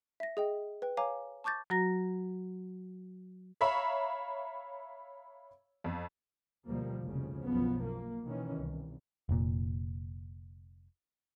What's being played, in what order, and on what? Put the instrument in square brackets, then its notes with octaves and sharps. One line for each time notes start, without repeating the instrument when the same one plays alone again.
[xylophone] E5 A#6
G#4 D#5 G5
B4 G5
C#5 F5 G#5 A#5 D6
A5 C#6 D6 G6 A6 A#6
[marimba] F#3 F#4 A#5 A#6
[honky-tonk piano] C#5 E5 F5 A#5 B5 C#6
F2
[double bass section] D2 B2 F3 G3 A#3
F1 D2 C#3 F3
B1 F#2 F3 B3
A#3
B2 D#3 E3 C#4
C2
[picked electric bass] F1 A#2